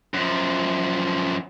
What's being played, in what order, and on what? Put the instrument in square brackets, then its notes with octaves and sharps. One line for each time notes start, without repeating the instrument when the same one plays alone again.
[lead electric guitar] F#2 F3